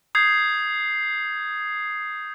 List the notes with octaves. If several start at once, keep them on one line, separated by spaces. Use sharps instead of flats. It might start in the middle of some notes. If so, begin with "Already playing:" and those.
D#6 G6 G#6 C7